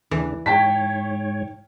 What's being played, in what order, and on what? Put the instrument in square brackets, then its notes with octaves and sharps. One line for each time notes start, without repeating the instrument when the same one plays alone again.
[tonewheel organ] D#2 C#3 D4 [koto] E3
[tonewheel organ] G#2 C#5 [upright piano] G5 A5 B6